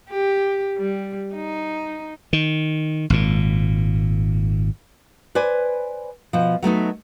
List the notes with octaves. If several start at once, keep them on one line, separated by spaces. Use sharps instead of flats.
G4
G3
D#4
D#3
G#1 A#2
B4 C5 D5 G#5
B2 F3
F#3 A3 B3 D#4